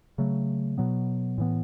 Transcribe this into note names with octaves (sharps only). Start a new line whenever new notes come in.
C#3 F#3 A3
B2 F#3 B3
A2 E3 B3